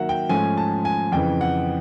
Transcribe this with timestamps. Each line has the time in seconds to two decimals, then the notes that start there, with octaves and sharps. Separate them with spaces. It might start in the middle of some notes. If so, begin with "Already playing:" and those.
Already playing: D#3 F#3 A#3 E5 F#5
0.09 G5
0.29 G#2 F3 A3 C#4 G#5
0.57 A5
0.85 G#5
1.12 F2 C#3 E3 G5
1.41 F#5